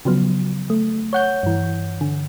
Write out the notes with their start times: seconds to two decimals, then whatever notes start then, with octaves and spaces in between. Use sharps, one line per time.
0.05 C#3 F3 F#3 B3
0.70 A3
1.13 C#5 F#5 G6
1.43 G2 E3
2.01 D3